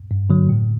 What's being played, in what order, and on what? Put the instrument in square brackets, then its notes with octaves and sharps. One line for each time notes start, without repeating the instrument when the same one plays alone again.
[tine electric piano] G2
D3 F#3
A2